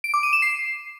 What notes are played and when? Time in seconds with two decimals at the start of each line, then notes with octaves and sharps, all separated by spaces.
0.04 D7
0.14 D6
0.23 D#7
0.33 E7
0.42 C7